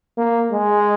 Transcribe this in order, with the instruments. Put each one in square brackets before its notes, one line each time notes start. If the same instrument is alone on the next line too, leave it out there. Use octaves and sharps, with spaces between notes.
[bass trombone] A#3
G#3